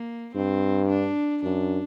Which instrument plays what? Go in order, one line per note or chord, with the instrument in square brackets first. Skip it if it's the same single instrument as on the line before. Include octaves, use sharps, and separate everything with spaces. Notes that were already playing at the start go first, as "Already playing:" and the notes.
Already playing: [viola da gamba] A#3
[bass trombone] G2 [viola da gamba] C4
[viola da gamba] D4
[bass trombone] F#2 [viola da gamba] D4